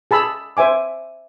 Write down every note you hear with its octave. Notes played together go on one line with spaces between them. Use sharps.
G#4 A5 B5 E6
C5 E5 G#5 D6